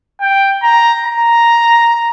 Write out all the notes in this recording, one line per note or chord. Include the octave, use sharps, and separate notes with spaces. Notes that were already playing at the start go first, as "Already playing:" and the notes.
G5
A#5
A#5